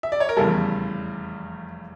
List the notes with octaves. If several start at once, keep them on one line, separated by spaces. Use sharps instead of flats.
E5
D5
C#5
A#4
F1 E2 C#3 G3 A4